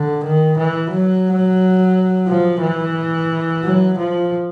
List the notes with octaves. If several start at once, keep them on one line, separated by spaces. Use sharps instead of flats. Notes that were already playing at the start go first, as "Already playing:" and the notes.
Already playing: D3
D#3
E3
F#3
F3
E3
F#3
F3